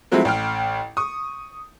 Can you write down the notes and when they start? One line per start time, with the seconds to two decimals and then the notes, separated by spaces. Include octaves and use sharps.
0.12 F3 F#3 G#3 A3 C4 E4
0.25 A1 G5 F6
0.97 C#6 D#6